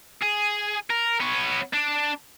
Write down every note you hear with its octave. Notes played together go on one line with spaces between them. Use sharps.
G#4
A#4
B3 C#5
D4